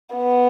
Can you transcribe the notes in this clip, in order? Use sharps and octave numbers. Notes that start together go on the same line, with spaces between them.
B3